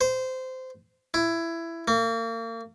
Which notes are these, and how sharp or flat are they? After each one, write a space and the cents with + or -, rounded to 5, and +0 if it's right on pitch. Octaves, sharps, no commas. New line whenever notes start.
C5 -20
E4 +15
A#3 -35